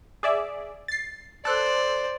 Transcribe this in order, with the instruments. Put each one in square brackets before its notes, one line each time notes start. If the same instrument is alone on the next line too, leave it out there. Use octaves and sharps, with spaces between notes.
[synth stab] G#4 D5 E5
A6 C7
[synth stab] A4 F#6 [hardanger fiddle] C5 D5